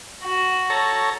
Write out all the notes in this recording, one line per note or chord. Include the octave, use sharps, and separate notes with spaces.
F#4
A4 C#5 A#5